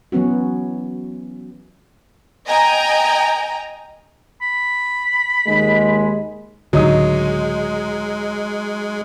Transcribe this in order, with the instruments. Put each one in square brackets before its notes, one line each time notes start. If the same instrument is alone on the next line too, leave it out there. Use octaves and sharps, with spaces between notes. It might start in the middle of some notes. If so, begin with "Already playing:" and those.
[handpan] E3 F#3 B3 C#4 F#4
[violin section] D#5 G5 G#5 A#5
[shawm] B5
[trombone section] D#2 G#3
[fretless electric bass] C#2 A2 D3 [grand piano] F#3 D#4 D#6 [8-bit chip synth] G#3